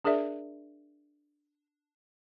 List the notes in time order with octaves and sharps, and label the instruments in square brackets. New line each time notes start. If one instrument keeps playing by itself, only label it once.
[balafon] D4 G#4 A#4 D5 E5